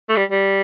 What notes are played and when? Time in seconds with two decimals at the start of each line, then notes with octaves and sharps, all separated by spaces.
0.09 A3
0.16 G3
0.31 G3